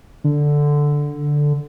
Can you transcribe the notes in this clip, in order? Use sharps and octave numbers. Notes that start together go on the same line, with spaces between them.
D3